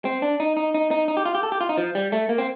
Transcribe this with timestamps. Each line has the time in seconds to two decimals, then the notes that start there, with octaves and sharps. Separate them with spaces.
0.05 C4
0.22 D4
0.40 D#4
0.57 D#4
0.74 D#4
0.91 D#4
1.08 D#4
1.17 G4
1.25 F4
1.35 G4
1.43 A4
1.52 G4
1.61 F4
1.69 D#4
1.78 F3
1.95 G3
2.12 A3
2.29 A#3
2.38 C4